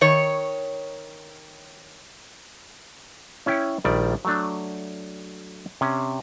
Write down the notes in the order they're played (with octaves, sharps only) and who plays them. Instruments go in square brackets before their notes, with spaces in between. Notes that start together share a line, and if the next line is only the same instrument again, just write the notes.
[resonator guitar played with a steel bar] D#3 C#5
[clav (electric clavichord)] C#4 E4 C#5 G5
A#1 D#3 G3 D5
F#3 A3 D4
C3 C#4